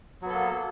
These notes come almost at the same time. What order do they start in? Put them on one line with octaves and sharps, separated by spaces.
F#3 B3 A4 A#3